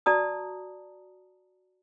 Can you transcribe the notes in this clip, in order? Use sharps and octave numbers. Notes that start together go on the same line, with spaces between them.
F#4 D5 A5 A#5 D#6